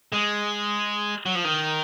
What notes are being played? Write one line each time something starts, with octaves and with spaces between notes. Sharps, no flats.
G#3
F#3
F3
D#3